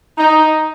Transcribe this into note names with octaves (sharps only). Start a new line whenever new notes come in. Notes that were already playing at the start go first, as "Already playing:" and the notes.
D#4